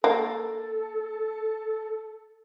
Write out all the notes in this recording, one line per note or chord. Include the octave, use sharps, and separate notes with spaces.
A#3 A4